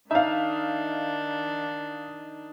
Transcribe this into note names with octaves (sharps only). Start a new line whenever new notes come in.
D#3 D4 D#4 E5 F5